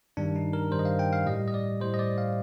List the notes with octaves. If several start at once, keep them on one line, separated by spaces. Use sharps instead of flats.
G2 D#3 G3 D4
D#4
A#4
G2 D#3 G3 C5
D#5
F5
G5
F5
A2 G3 D#5
D#5
D5
A2 G3 C5
D#5
D5
F5